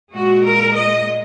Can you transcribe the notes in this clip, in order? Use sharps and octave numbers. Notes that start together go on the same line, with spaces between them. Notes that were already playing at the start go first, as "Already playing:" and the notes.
A#2 G#3 F#4
A#4
D#5